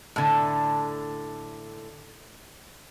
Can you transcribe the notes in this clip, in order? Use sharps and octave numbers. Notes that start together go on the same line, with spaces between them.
A2 D3